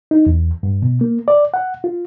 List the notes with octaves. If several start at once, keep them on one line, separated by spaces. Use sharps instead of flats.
D#4
E2
G2
B2
A#3
D5
F#5
F4